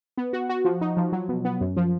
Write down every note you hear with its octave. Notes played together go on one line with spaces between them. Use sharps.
B3
F#4
F#4
F3
D#4
F3
F#3
B2
B3
F#2
F3